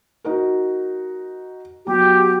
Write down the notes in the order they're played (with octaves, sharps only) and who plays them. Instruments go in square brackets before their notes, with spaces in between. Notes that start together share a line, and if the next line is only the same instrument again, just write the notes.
[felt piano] D#4 F#4 A#4
[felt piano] F#3 B3 [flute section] G4